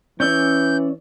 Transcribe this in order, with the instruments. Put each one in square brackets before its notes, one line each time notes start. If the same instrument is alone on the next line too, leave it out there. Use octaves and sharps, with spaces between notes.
[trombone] E3 [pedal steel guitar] C#4 D5 E6 [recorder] G6